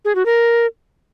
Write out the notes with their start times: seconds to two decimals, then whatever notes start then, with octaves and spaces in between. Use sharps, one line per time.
0.05 G#4
0.15 F#4
0.26 A#4